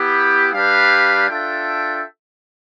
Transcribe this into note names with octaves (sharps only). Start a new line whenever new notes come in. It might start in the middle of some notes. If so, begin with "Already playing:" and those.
Already playing: B3 E4 G4
G3 D4 G4 B4 F5
D4 F4 A4 E5 G5